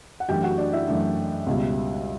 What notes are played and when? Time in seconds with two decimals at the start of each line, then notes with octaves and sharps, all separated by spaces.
0.20 F#5
0.29 F#2 E3 A3 D4 G4 G5
0.44 F#4 F#5
0.58 D4 D5
0.73 E4 E5
0.87 F#2 E3 A3 D4
1.46 C#2 B2 G3